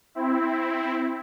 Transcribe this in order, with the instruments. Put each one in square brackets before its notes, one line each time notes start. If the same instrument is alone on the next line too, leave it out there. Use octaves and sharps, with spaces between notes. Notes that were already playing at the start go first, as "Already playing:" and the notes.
[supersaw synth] C4 E4